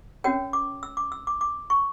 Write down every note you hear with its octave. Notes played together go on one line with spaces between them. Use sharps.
C#4 F#4 A#4 C#5 G5
D6
E6
D6
E6
D6
D6
C#6